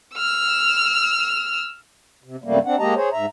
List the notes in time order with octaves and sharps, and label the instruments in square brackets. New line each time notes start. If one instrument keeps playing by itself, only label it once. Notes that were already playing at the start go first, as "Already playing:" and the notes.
[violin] E6 F6
[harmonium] C3
F#2 C3 G3 A3 A#3
C4 D4 F#5
G#3 A#3 G4 D#5 A5 A#5
G#4 C5 C#5
G#2 E5 A#5